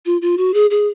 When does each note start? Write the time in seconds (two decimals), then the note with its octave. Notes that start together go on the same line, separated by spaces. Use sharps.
0.06 F4
0.22 F4
0.37 F#4
0.54 G#4
0.71 G#4